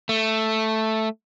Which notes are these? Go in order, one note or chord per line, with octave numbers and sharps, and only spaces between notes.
A3